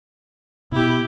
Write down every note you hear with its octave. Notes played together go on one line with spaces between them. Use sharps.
B2 E4 G4